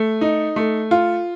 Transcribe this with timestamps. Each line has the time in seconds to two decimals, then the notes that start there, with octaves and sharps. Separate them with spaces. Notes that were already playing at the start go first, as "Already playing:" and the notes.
Already playing: A3
0.21 D#4
0.56 A3
0.91 F4